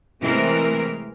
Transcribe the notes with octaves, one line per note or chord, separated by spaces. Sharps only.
C3 E3 G#3 A3 C4 A#4